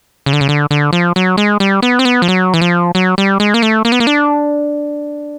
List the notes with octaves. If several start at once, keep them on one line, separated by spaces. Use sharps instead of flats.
C#3
D3
C#3
D3
D3
F3
F#3
G#3
G3
B3
C4
B3
F3
F#3
E3
F3
F#3
G3
G#3
A#3
A3
A#3
B3
A#3
D4